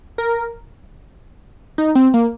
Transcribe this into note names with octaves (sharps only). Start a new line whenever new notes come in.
A#4
D#4
C4
A#3